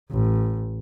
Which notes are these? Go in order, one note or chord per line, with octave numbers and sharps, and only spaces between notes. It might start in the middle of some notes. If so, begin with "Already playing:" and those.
A1